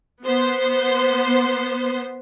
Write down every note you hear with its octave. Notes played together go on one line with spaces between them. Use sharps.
B3 C5